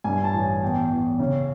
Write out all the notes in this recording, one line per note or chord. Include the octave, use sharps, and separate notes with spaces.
G2 G#5
A5
A1
G#5
E2 G5
E2
C#3